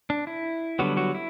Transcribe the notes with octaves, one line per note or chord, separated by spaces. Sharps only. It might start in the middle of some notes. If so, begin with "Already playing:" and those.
D4
E4
D3 F#3 G3 B3 F#4
F#3 F#4
E4